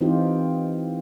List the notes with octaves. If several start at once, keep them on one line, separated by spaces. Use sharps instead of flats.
E3 C4 D#4 F4 G4